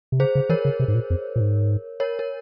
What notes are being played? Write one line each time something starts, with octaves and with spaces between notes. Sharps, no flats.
C3
C#3 G#4 C5
C#3
E3 A#4 C#5
C#3
C3
G#2
A#2
F2
A#2
G#2
A#4 C#5
A#4